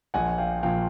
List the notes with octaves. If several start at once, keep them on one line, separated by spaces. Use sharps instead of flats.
A#1 A#2 F3 F#5 G#5
F5 G5
A#2 F3 F5 G5